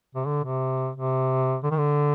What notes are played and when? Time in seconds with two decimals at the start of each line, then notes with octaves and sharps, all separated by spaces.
0.15 C3
0.26 D3
0.44 C3
0.96 C3
1.64 D3
1.71 D#3
1.78 D3